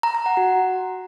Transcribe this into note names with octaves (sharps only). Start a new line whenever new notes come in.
A#5
A#5
F#5
F#4